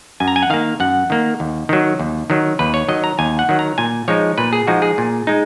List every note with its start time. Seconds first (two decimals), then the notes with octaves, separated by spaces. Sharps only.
0.20 F#2 G#5
0.28 A#5
0.36 G#5
0.42 F#5
0.50 D#3 A#3 F5
0.80 F#2 F#5
1.10 D#3 A#3
1.40 D#2
1.69 D#3 F#3
1.99 D#2
2.30 D#3 F#3
2.59 D#2 B4
2.74 C#5
2.89 D#3 F#3 D#5
3.04 A#5
3.19 D#2 G#5
3.39 F#5
3.49 D#3 F#3
3.59 A#5
3.78 A#2 G#5
4.08 F3 G#3 D#4 C#5
4.38 A#2 B4
4.53 G#4
4.67 F3 G#3 D#4 F#4
4.82 G#4
4.98 A#2
5.27 G#3 D#4